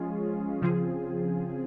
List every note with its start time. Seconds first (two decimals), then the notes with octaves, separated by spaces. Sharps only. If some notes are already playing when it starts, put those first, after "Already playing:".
Already playing: F3 G#3 C#4 F4 G#4
0.62 C#3 F3 C4 F4 G#4